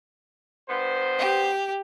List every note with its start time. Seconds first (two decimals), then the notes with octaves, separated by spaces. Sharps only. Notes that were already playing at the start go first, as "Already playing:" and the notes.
0.69 G2 B3 C5
1.18 G4